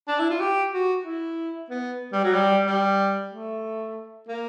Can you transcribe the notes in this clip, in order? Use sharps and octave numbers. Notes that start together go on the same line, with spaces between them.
D4
E4
F4
G4
F#4
E4
B3
G3
F#3
G3
G3
A3
A#3